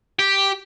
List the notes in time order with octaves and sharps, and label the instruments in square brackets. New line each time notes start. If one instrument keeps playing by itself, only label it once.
[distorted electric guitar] G4